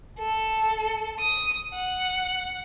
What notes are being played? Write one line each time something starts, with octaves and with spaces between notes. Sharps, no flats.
A4
D#6
F#5